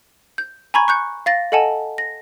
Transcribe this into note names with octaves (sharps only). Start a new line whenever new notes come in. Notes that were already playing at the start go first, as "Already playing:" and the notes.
G6
G#5 A#5 B5 C#6 G#6
C#6 F#6 G6 C#7
F5 A6 A#6
A4 D#5 F#5 G#5 A5
A#6